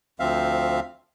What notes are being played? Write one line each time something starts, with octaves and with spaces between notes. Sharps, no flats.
D2 F3 C4 E5 F5